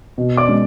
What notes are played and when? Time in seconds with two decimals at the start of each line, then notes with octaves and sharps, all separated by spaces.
0.18 B2
0.37 D5 D6
0.48 G#3 C#4